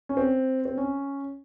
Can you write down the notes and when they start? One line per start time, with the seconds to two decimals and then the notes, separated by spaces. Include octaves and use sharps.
0.09 C#4
0.17 C4
0.65 C4
0.78 C#4